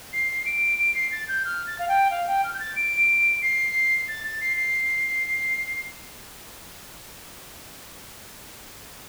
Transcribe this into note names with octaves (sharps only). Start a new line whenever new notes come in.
C7
D7
D7
C7
A6
G6
F6
A6
F5
G5
F5
G5
F6
G6
A6
D7
C7
A6
A6
C7
C7